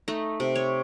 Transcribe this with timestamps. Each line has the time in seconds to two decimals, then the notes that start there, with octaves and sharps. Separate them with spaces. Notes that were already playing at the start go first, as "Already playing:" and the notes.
0.08 A3 D#4
0.40 C3
0.56 C#5